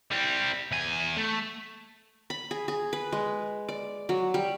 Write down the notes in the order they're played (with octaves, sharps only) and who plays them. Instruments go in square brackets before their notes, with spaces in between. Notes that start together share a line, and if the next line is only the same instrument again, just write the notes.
[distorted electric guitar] G3 C4
E2 G#5
A3
[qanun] B5
G#4
G#4
B4
G#3
D5
F#3
G3